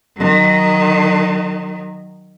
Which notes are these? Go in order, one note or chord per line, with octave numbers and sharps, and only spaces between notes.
D#3 F#3